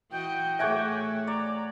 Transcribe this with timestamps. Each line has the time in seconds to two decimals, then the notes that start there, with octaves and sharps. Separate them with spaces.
0.11 E3 F#4 D#5 G5
0.59 A2 A3 G#4 C#5 E5 F#5 G#5
1.27 D5 A#5